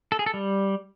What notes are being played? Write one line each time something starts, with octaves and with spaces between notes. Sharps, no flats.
A4
G#4
A4
G3